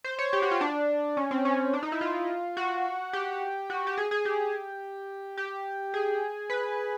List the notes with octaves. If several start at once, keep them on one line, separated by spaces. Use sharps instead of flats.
C5
C#5
G4
F#4
F4
D4
C#4
C4
C#4
D4
D#4
E4
F4
F#4
G4
F#4
G4
G#4
G#4
G4
G4
G#4
B4